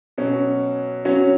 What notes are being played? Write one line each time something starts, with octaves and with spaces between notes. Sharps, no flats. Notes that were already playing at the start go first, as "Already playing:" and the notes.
B2 F#3 C#4
F#3 C#4 F#4 C#5